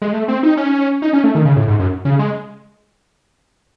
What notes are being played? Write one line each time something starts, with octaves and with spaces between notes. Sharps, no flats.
G#3
A3
C4
D#4
C#4
D#4
C#4
A3
D#3
C#3
A2
G#2
F#2
C#3
G#3